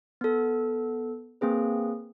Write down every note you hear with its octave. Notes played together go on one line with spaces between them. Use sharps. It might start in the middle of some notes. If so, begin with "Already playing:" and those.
B3 A4
A#3 C4 G#4 B4